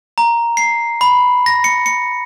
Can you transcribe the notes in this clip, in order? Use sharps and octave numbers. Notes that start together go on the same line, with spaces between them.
A#5
C7
B5
A#6
C#7
C#7